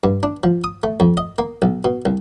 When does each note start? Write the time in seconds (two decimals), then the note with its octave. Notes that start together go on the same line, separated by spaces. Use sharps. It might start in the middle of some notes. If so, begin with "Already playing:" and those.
0.04 G2
0.23 D4
0.44 F3
0.64 D#6
0.83 A3
1.00 F2
1.17 D#5
1.38 A#3
1.62 B1
1.85 B2
2.05 C2